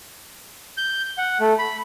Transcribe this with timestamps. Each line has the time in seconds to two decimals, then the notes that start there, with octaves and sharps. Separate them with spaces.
0.77 G6
1.18 F#5
1.40 A3
1.58 B5